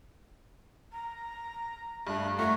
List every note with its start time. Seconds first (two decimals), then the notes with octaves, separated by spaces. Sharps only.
0.92 A#5
2.07 G2 A3 F#6
2.39 A3 F#5 A#5 C#6